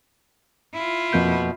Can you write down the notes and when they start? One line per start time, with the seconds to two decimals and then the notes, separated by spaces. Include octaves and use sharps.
0.74 E4 F4
1.13 F2 B2 A#3 G6